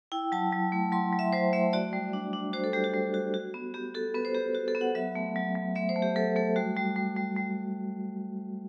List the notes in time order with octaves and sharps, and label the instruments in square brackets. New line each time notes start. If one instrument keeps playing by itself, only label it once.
[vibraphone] E4 G5
F#3 A5
F#3
A3
F#3 C6
F#3
E5
F#3 C5
A3 E5
F#4 D5
G3
D4
D4
F#4 C5
A4
G3 G4
F#4
G3
F#4
F#4
B3
B3 G4
F#4 A4
B3 B4
C5
B3 G4
F#4
A4
B3
F#5
F#3 E5
A3
F#3
F#3
A3 E5
C5
A3
G4
F#3 A4
A3 A4
G3 F#4
G3
G3
G3
G3